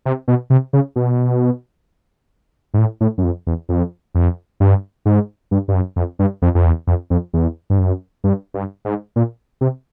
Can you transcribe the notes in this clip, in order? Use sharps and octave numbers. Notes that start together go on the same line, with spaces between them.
C3
B2
C3
C#3
B2
G#2
A2
A2
F#2
F2
E2
F2
F2
G2
G#2
G2
G2
F#2
F2
G2
F2
F2
E2
F2
F2
E2
G2
F#2
G2
G2
G#2
A#2
C3